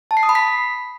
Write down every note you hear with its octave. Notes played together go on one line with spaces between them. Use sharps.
A5
C7
D#6
B5
B6